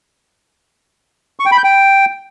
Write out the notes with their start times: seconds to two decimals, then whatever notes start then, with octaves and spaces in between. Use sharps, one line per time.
1.40 C#6
1.46 G5
1.52 B5
1.58 G6
1.64 G5